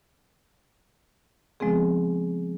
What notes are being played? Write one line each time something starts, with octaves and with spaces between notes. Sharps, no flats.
C#3 F3 G#3 B3 C4 G#4